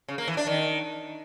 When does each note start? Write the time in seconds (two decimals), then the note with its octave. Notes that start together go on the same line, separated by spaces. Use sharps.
0.08 C#3
0.18 A#3
0.28 E3
0.37 D4
0.47 D#3